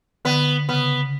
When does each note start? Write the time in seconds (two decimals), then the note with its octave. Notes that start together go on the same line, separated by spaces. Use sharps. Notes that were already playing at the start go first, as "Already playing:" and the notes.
0.25 D3 B3
0.69 C#3 B3